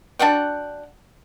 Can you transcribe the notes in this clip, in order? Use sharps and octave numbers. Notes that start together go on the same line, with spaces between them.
D4 F#4 F#5 G5